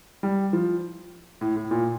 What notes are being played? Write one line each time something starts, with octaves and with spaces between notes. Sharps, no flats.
G3
F3
A2
A2
A#2